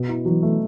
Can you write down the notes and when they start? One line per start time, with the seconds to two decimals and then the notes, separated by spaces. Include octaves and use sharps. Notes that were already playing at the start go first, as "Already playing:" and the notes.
Already playing: B2
0.09 E4
0.26 E3 F#3
0.42 A3